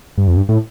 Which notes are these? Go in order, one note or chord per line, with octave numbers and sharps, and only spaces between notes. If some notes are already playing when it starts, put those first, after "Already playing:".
G2
F2
G2
A2